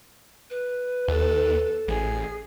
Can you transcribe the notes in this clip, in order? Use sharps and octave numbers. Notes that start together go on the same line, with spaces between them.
B4
D#2 A4
A1 G#4 G#5